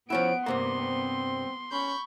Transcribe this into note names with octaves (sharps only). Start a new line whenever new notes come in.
F3 B3 C#4 E4 F#5 D7
G2 C3 A#3 C6
C4
C#4 B5 C#6 G6